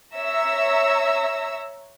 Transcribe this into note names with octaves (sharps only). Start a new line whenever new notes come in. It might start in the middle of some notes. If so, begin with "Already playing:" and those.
C#5 E5 A#5 E6